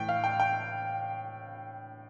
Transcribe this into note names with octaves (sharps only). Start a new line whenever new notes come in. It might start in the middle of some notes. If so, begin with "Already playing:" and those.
Already playing: A2 E3 G5
F5
G5
G5